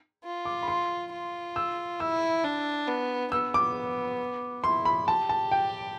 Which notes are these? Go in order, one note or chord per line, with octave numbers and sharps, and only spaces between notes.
F4
D6
B5
C6
F4
E6
E4 E6
D4
B3
B3 E6
D6
E4 C6
B5
G4 A5
A5
G5